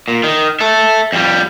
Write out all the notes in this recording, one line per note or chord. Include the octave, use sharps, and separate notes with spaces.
A#2
D#3
A4 E5
F2 G3